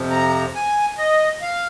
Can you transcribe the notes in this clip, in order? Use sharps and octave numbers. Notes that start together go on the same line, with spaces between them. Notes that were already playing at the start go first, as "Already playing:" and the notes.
Already playing: F2 C3 F3
A#5
G#5
D#5
F5